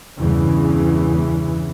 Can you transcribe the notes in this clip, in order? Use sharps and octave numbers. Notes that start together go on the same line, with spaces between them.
E2 G2 C#3 E3